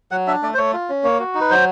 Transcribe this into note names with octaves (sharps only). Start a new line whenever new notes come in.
F#3 F#5
D4 E5
A3 D5
C5
A3 C#5
F4
C#4
A#3 C#5
F#4
D#4
B4
F#3 C5